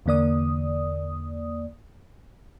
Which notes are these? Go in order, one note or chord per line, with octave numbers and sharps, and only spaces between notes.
E2 D3 A#3 D5 D#6